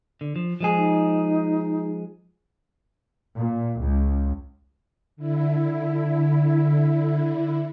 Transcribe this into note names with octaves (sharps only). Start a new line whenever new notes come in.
D3
F3
F3 G#3 G#4
D#4
A#2
C#2
D3 E4